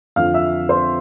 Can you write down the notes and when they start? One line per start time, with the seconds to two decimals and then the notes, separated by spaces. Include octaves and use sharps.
0.16 F2 D3 F3 F5 F6
0.34 E5 E6
0.69 C5 C6